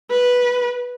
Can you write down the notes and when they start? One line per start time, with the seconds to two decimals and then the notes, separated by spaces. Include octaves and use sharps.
0.10 B4